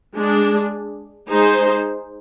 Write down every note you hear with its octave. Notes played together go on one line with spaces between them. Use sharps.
G#3 D4 G#4
G#3 D#4 G#4 C5